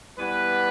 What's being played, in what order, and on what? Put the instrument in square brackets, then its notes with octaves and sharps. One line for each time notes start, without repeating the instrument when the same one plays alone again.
[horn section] E3 G3 B3 B4